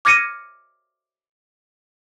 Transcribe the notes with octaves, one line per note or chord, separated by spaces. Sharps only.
D6 F6 G#6 A#6 C#7 D#7